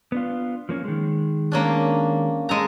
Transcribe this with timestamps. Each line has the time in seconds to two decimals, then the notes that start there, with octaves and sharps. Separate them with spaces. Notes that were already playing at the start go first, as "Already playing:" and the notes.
0.12 B3 D4 F4
0.69 F3 A#3 C#4
0.84 D#3 G#3
1.52 A#3 C#4 D4
2.49 G#3 A4 A#5